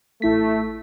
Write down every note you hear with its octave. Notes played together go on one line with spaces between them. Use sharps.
A1 A3 E4 B6